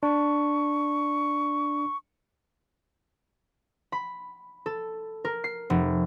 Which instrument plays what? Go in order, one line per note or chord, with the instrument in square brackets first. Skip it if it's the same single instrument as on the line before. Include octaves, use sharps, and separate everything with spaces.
[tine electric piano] D4 [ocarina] C#6
[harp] B5
A4
A#4
C7
F1